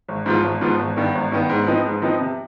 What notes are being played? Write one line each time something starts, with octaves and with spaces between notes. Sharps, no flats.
G#1
G#2 F3 B3 F4
G#1
G#2 F3 B3 F4
G#1
G2 D#3 B3
G#1
G2 D#3 B3
G#2
F3 C4 D#4 B4
G#2
F3 C4 D#4 B4
C3